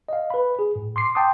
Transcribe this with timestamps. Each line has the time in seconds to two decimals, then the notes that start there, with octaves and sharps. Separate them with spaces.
0.09 D#5 F5
0.30 B4 B5
0.59 G#4
0.76 A2
0.96 C6 D6 C7
1.15 G5 A5 C6 D6 D#6